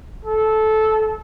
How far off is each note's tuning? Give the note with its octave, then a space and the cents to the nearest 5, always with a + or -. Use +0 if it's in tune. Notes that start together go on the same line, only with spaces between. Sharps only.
A4 -15